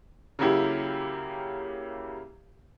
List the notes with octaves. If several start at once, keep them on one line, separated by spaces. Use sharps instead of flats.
C#3 F#3 A#3 E4 G4